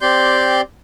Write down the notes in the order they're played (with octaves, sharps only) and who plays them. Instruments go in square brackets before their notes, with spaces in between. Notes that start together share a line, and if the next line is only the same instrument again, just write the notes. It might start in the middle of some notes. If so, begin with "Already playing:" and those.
[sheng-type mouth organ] C4 G4 D5 C6 G6